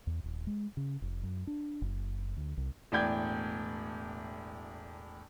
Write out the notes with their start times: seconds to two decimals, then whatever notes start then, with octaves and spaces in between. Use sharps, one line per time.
0.07 E2
0.24 D#1
0.47 G#3
0.77 C#3
1.02 F1
1.23 F#2
1.47 D4
1.82 F#1
2.37 D2
2.57 C2
2.92 E1 A2 D5 G5 G6 G#6